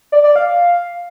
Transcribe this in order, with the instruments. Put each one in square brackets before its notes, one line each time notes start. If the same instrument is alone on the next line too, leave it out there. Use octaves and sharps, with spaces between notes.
[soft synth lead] D5
D5
F5